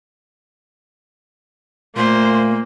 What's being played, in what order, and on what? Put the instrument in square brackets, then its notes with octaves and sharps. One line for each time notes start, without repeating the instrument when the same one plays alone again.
[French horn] A#2 [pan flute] A3 [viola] A#3 [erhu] C5